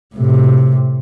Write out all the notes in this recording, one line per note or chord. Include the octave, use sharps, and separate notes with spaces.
A2 C3